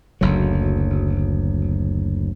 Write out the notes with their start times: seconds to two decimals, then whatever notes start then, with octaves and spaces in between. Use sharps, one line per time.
0.21 F#1 D2 F#3